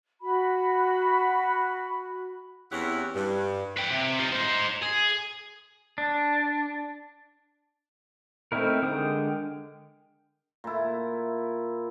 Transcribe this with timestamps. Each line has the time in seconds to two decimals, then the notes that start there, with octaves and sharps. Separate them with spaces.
0.21 F#4 B5
2.72 E2 C4 C#4 E4 G4 F#5
3.15 G2
3.77 B4 G5
3.91 C3
4.19 D#4 F4
4.33 D#4 C5
4.83 G#4
5.98 D4
8.52 A3 C4 D#4 E4 A#4
8.82 D3 G#3 A#4 G5 D#6
10.64 A#2 E4